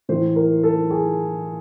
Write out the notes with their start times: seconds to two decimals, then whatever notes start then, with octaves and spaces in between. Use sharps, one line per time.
0.09 A2 E3 C5
0.36 A#4
0.64 A4
0.90 G#4